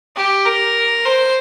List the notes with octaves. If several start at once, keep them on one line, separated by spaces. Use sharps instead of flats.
G4
A#4
C5